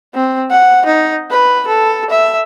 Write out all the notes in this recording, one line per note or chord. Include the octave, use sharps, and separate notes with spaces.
C4
F#5
D#4
B4
A4
E5